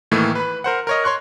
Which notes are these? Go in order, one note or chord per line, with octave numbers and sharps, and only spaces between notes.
A2 D#3 E3 A3 A#3
B4 B5
A#4 C5 F#5
A#4 C#5 D#5
C#5 C6 C#6 F#6